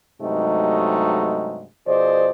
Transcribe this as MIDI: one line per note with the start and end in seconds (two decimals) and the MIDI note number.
0.21 1.65 43
0.21 1.65 48
0.21 1.65 54
0.21 1.65 56
0.21 1.65 57
0.21 1.65 63
1.87 2.30 47
1.87 2.30 53
1.87 2.30 68
1.87 2.30 72
1.87 2.30 74
1.87 2.30 75